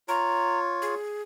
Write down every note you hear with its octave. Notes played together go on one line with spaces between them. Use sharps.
F4 C#5 A#5
G#4